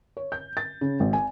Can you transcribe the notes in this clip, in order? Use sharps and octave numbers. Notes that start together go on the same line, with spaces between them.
C#5
G6
A6
C#3
G#1
G#5